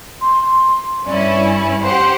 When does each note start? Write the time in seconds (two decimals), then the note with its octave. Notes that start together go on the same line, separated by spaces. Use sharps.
0.21 C6
1.06 G2 C#4 E4 D5
1.83 G4 C5 F#5 C6